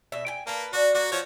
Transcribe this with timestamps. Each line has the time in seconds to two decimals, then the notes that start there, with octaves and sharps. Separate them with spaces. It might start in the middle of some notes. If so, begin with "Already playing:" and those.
0.12 B2 E5
0.27 G5 G#5
0.47 A#3 B4 A5
0.73 D4 F#4
0.95 A#3 F#4
1.12 F3 C#5 F#5